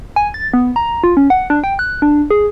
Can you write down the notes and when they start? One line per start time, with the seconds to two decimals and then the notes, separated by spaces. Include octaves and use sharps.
0.16 G#5
0.34 A6
0.54 B3
0.76 A#5
1.04 F4
1.17 C#4
1.30 F#5
1.50 D4
1.64 G5
1.79 F#6
2.02 D4
2.31 G#4